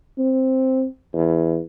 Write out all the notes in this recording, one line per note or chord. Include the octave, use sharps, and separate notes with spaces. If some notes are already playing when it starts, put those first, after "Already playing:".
C4
E2